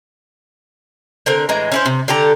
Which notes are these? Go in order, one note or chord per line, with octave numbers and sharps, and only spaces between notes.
D3 C4 A#4
A2 E3 G#3 A#5
C#4 E4 C5
C3
D3 G4 A4 A#5